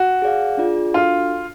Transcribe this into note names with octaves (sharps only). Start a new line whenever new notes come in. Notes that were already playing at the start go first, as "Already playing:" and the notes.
Already playing: F#4
G#4 D5 F5
D4 F4 G#4 D5
D4 F4 F#4 A4 F5